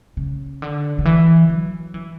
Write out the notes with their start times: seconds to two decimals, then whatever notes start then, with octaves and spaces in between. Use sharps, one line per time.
0.17 C#3
0.62 D3
0.99 D3
1.05 E3
1.49 F#3
1.94 E3